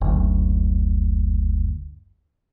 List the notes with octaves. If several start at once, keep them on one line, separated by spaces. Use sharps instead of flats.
F#1 D2